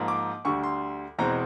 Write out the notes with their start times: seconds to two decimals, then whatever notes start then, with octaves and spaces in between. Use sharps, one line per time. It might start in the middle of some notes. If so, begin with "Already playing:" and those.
Already playing: G#2 F3 A#3
0.08 D6
0.45 D2 D3 G3 C#6
0.63 C6
1.19 E2 B2 G#3 C4 A#5